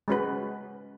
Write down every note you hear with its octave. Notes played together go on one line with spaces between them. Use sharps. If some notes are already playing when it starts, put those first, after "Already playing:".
G#3 C#4 F#4 B4